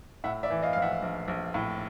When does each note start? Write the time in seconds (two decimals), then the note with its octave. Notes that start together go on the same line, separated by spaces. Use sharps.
0.24 A2 E5 F#5
0.43 D5 E5
0.50 E3
0.63 D#5 F5
0.73 A#1 F5
0.82 E5 F#5
1.02 A#1
1.28 A#1
1.54 A2